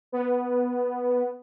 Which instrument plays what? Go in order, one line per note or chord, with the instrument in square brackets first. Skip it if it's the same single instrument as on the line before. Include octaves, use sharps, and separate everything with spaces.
[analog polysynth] B3